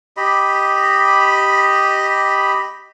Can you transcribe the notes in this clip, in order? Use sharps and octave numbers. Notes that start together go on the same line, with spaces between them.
G4 D#5 B5